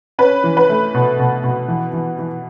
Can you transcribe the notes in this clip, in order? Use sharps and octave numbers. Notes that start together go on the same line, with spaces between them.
C#4 B4
E3
B4
A3
B2
B2
B2
E3
E3
E3